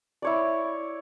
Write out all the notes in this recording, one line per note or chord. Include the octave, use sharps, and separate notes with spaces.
E4 C#5 D5